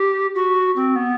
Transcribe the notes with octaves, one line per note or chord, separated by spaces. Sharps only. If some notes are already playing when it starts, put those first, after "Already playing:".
Already playing: G4
F#4
C4
B3